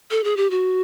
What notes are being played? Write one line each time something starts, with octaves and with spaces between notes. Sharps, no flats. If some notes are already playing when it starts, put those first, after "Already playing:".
A4
G#4
G4
F#4